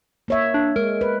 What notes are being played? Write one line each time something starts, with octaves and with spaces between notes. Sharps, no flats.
A#3 C#5 E5
D4
G#3 A#4
B4